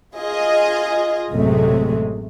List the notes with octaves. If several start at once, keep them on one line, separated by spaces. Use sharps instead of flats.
F4 G#4 D#5
A1 F#2 C3 G#3 A3